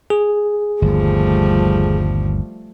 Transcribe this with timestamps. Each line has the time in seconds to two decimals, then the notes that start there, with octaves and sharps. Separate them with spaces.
0.10 G#4
0.82 G1 D#2 F3 G3 A3